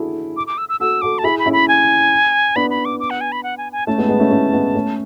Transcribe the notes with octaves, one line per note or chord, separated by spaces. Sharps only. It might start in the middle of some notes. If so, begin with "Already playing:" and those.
Already playing: D4 E4 F#4 G#4 A4
D6
D6
E6
E6
F#4 A4 E6
F#4 A4 D6
A5
E4 G#4 B5
B5
C#4 E4
B5
G#5
B3 D4 B5
B5
D6
D6
F#5
G#5
B5
F#5
G#5
G#5
A3 C#4 A5
G#3 B3
A3
G#3 B3
A3 C#4
A3 C#4
G#3 B3
A3 C#4